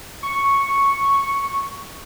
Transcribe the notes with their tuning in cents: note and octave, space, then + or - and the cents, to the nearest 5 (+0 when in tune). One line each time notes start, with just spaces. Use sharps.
C#6 +0